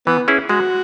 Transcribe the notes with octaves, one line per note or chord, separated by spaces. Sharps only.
E3 B3
C#4 E4 G#4
G#3 F#4